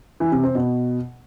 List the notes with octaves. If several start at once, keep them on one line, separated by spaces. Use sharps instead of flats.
E3
C3
C4
B2